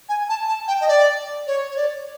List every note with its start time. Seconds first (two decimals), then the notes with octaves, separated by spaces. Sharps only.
0.09 G#5
0.29 A5
0.48 A5
0.68 G5
0.81 D#5
0.88 D5
1.47 C#5
1.70 C#5
1.76 D5